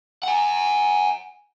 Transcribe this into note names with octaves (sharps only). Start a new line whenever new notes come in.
F#5 G#5